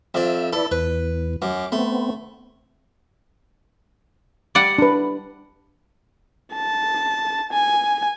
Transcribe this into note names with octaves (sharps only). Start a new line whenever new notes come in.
F2 D5 E5
E4 A4 B4 D5
E2 B4
F#2 D6
A3 B3 C4
G3 D5 F#5
D4 B4
A5
G#5